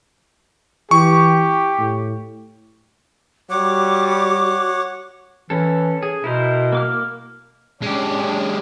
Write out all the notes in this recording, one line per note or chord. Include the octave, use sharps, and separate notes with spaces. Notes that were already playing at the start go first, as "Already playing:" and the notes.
E3 G4 C#6
A2
G3 F#4 C#5 F#5 D6
E3 C#4 A4
G#4
B2 E4 A#4 C5
A#3 D6 F6
G#3 C#4 D4 G4